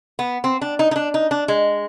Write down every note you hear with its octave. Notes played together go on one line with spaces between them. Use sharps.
B3
C4
D4
D#4
D#4
D4
D#4
D4
G#3